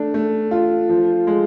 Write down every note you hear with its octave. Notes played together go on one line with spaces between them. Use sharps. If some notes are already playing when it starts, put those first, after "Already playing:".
Already playing: A3 D4
A3
F4
F3
G#3